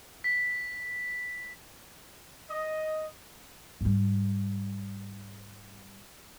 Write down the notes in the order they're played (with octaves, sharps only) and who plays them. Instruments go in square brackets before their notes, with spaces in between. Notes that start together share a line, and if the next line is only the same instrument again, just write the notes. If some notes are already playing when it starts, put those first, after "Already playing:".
[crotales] B6
[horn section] D#5
[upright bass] G#2 G3